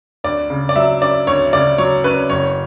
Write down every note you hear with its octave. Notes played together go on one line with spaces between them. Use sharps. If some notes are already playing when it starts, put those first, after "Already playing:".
D2 D5
C#3
D5
F#3 E5
C#4 D5
D2 C#5
C#3 D5
F#3 C#5
C#4 B4
F#1 C#5